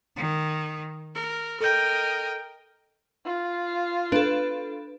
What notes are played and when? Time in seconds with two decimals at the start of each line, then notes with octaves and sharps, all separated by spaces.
0.16 D#3
1.16 A#4
1.61 A4 A#4 D#5 G5 G6
3.26 F4
4.12 D4 A4 B4